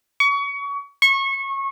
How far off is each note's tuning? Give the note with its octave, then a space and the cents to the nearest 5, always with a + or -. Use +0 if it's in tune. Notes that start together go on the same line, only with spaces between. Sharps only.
C#6 +30
C#6 -25